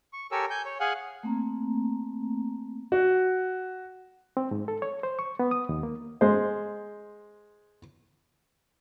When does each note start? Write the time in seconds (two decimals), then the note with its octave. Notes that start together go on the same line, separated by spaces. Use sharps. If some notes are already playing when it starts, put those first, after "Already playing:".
0.13 C#6
0.32 G4 A4 A#4 C#5 G#5 E6
0.50 G#5 G6
0.65 C#5
0.80 G#4 F5 F#5 G#5
1.23 A3 A#3 C4 A#5
2.92 F#4
4.37 C4
4.51 G#2
4.68 A4
4.82 C#5
5.03 C5
5.19 C#6
5.39 B3
5.51 D#6
5.69 D#2
5.83 A#3
6.21 G#3 C5